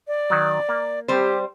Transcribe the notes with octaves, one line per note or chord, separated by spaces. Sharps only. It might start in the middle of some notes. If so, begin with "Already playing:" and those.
D5
D#3 F#3
A#3
G3 C4 G4 C5